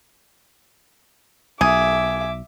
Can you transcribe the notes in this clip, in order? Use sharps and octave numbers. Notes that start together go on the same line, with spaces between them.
B1 G#4 E5 D6